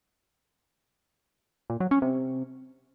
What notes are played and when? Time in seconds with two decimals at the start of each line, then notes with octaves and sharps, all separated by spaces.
1.70 A#2
1.80 F#3
1.91 C#4
2.02 C3